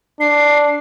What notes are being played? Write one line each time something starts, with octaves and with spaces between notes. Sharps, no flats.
D4 C7